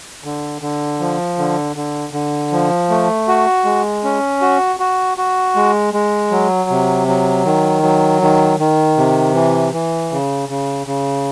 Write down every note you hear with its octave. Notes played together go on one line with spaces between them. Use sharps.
D3
D3
F3
D3
D3
D3
F3
A3
F#4
G#3
C#4
F#4
F#4
F#4
G#3
G#3
F#3
C3
F#3
D#3
F#3
D#3
D#3
C3
E3
E3
C#3
C#3
C#3